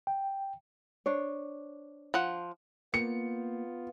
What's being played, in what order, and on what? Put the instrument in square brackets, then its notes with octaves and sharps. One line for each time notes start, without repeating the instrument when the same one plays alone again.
[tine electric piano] G5
[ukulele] D4 C5 C#5
[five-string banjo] F3 F#5
[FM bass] A#3 [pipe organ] B3 F4 [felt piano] C#7